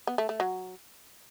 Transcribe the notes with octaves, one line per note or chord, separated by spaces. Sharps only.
B3
A3
A3
F#3